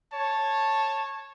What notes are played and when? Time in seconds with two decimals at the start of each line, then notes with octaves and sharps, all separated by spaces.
0.12 C#5 A5